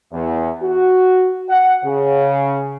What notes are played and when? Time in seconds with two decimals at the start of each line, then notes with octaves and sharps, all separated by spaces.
0.12 E2
0.63 F#4
1.50 F#5
1.85 C#3